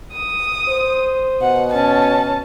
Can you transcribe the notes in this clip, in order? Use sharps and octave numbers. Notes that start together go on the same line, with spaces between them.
D#6
C5
B2 F#5
C#4 A5